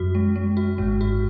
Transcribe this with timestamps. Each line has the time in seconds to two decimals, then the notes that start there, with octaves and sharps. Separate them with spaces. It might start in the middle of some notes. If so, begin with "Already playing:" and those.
Already playing: F#2 F#4
0.15 G#3
0.36 G#3
0.57 F#4
0.78 G#1 G#2 G#3
1.01 F#4